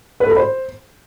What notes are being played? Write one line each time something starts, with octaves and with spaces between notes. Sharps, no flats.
B4
A4
B5
C5